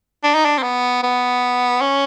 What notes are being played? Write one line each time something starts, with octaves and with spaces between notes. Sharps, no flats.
D4
D#4
D4
C4
B3
B3
C#4